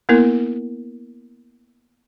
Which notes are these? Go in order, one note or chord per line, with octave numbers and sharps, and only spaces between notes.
A#3 B3 E4 A#4